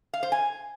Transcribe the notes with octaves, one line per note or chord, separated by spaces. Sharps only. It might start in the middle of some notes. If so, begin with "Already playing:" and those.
F5
C5
G#5